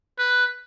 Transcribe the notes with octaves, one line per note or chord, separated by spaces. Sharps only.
B4